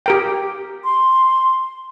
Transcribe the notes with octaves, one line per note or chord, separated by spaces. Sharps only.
G4 A#4 G5
C6